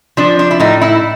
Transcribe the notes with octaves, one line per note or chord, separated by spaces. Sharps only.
F3 D4
D4
E4
A2 D#4
E4